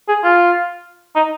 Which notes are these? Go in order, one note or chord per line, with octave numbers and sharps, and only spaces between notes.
G#4
F4
D#4